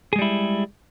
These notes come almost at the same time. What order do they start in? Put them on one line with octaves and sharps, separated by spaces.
G#4 G#3 G3 E4